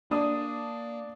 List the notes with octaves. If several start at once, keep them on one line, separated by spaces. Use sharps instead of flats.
A#3 D4 D#6